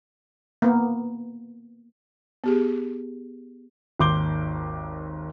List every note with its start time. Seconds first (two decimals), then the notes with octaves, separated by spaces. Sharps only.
0.62 A#3 B3
2.44 B3 G4 G#4
4.00 G#1 D#2 C6 D6 G6 G7